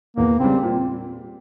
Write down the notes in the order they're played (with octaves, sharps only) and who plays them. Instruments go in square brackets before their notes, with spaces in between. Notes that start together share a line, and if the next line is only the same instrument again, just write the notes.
[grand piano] E2 [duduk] A#3
[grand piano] C#3 G3 [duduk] C4
[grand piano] A#2